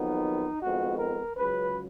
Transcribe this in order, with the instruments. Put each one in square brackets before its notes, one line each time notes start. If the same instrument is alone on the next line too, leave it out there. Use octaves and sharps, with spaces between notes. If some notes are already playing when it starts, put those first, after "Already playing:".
Already playing: [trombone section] F2 D#3 F#3 B3 D#4
F2 D#3 G#3 B3 F#4
A#4
C#2 C#3 F#3 B4